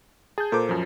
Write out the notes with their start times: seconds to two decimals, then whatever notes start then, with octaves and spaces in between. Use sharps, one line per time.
0.38 G#4 A5 G6
0.52 A#2 A4 A#4 C5 D6
0.69 F#2 F3